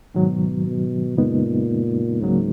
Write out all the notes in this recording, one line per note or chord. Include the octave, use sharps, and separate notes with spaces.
G#2 B2 D#3 F#3
B2
F#2 A#2 C#3 G#3 B3 D#4
C#2 G#2 C#3 F#3 A#3